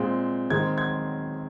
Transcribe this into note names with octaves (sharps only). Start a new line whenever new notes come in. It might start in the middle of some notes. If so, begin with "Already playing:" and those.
Already playing: A#2 G#3 C4
D#3 G#3 C4 G#6
G#6